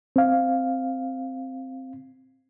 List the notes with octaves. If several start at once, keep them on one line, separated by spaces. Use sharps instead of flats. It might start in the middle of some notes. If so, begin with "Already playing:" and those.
C4 F5